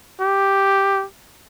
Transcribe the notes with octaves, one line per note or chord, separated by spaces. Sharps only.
G4